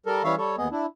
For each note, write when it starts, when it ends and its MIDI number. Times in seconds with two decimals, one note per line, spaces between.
0.06 0.23 55
0.06 0.23 69
0.06 0.23 70
0.24 0.35 52
0.24 0.35 55
0.24 0.35 61
0.24 0.35 73
0.24 0.35 76
0.24 0.35 77
0.38 0.56 55
0.38 0.56 69
0.38 0.56 73
0.58 0.68 39
0.58 0.68 59
0.58 0.68 68
0.58 0.68 75
0.72 0.86 62
0.72 0.86 64